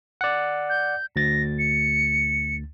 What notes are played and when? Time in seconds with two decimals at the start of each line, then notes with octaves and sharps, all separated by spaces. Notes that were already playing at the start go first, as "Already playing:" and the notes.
0.21 D5 F#5
0.69 G6
1.16 D2 A6 A#6
1.59 C#7